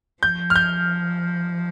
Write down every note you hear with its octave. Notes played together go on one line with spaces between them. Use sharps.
F3 G6
F6
G6